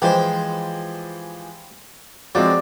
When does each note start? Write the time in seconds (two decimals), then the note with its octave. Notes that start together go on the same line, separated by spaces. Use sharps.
0.02 E3 F3 G#3 G4 C5
2.35 F3 F#3 G#3 C4 D5